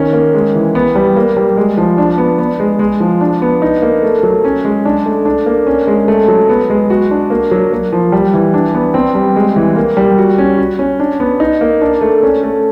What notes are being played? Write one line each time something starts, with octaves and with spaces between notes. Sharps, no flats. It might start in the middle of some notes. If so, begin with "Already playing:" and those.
Already playing: D#3 C#4
A#3
G#3
E3
B3
G3
A#3
G3
G#3
F3
D4
B3
B3
G#3
G#3
F3
D4
B3
D#4
A#3
A3
F#3
C#4
G#3
D4
A3
D4
A#3
C#4
G#3
A3
F#3
B3
G#3
F#4
D4
A#3
F#3
A#3
F3
G3
E3
D4
B3
C4
G3
G#3
E3
A#3
G3
F#4
C#4
F#4
C#4
D4
B3
D#4
A#3
D4
A3
C#4
A3